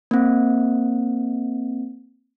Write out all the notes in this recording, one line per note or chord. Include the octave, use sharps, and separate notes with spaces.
A#3 C4